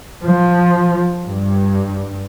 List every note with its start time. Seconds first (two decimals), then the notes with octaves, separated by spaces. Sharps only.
0.23 F3
1.28 G2